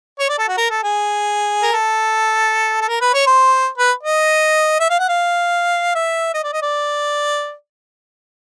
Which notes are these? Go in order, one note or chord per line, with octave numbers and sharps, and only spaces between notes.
C#5
D5
A4
F#4
A#4
A4
G#4
A#4
A4
A4
A#4
B4
C#5
C5
B4
D#5
E5
F5
F#5
F5
E5
D#5
D5
D#5
D5